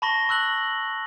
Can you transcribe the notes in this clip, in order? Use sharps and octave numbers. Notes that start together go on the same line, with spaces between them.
A5 B5 C#6 A#6 G7
A5 C#6 E6 F#6 F#7